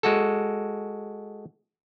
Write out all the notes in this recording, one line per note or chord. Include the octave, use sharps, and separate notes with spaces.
G#3 F#4 A4